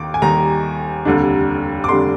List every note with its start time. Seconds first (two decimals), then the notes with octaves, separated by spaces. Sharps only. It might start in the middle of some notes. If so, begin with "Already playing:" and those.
Already playing: D#2 D#3 D6
0.14 G#5
0.22 D#2 D#3 G3 A#5
1.05 F1 D#2 D3 G3 D4
1.84 D6
1.88 F1 D#2 D3 G3 D4 C6